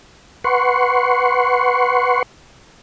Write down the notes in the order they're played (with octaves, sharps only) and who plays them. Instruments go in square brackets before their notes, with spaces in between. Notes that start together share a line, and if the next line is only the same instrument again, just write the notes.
[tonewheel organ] B4 F#5 C6 C#6